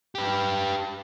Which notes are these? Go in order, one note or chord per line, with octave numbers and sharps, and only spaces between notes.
G4 B4